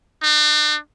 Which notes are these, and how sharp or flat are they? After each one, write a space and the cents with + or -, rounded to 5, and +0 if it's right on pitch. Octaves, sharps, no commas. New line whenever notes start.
D4 +45